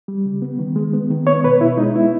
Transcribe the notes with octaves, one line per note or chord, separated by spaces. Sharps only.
G3
C#3
B3
D#3
G#3
B3
D#3
B3 C#5
B2 B4
B2 E4
G#3 D#4
B3 E4